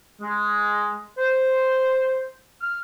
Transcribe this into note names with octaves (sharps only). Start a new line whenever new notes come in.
G#3
C5
F6